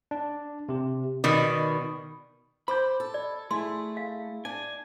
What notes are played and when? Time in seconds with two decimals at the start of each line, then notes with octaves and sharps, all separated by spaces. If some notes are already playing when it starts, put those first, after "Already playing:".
0.11 D4
0.69 C3 G4
1.24 B2 D#3 D5 B5 D#6
2.68 C5 B5 D6 G6
3.00 A4
3.14 D5
3.51 A3 E4 G#4 C6
3.97 F5
4.45 D4 G#5